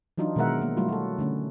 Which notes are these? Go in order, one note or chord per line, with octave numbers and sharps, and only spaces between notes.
E3 F#3 D4 D#4 F4
B2 D#3 G#3 A#4 E5 F#5
A#3
F#3 G3 A3 E4 F4
F#4 A4
D3 A3 C#4